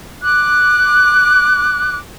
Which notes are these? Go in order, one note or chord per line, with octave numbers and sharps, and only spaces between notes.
D6 F#6